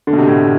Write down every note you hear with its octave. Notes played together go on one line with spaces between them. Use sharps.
D3
B2
C3
A2